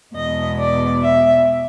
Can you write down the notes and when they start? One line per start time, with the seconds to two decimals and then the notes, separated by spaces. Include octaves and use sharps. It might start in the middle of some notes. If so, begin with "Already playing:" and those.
0.15 E2 B2 G#3 B3 D#5
0.58 D5
1.00 E5